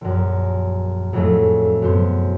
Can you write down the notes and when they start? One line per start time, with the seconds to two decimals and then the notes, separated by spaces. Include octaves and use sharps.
0.01 A#1 F#2
1.13 F2 A2 F#3 G#3 A3
1.82 F#2 B2 B3 C5